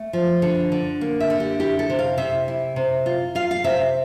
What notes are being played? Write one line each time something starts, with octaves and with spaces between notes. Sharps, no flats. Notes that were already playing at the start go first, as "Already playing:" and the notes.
Already playing: A3
F3
D3
D3
A#3
E5
D3
G4
E4 G4
A4
C3
F5
C3 E5
E4
C3
F4
F4 F5
F5
C3 E5